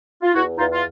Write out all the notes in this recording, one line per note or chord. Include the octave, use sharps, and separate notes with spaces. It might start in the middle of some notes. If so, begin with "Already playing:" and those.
F4
E2 E4 F#4
E2 D#4 F4
F4